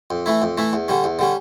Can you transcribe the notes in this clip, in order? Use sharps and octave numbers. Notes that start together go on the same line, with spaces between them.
F2
E3 A3 E4
F2
E3 A3 E4
E2
D3 G3 C#4
E2
D3 G3 C#4